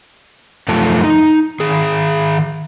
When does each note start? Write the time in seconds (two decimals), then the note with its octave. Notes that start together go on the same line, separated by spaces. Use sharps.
0.68 F#2 F3 A3 A5
1.04 D#4
1.60 D#3 G#4